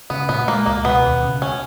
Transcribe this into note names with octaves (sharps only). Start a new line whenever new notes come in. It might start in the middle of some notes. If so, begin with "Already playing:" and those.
C#3 B3
A#2 B3
G#3 A#3
C#2 A#3
B2 B3
D#2
C#3
C#4